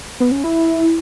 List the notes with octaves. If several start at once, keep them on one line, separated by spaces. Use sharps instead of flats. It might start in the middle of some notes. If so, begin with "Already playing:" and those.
B3
C#4
E4